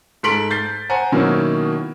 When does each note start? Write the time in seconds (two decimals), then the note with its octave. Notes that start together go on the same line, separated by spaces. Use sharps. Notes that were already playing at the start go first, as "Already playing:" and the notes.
0.23 G#2 A4 C6 B6 D7 F#7
0.50 G6 A6 C7
0.89 C5 F#5 G#5 A#5
1.12 B2 D#3 F#3 A#3 C#4 E4